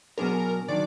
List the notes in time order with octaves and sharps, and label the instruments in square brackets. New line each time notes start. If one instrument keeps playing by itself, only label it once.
[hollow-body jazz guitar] B2 F#3 B3 D4 G#4 [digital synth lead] A#4
[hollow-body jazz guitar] D#3 F#3 D4 [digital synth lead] D5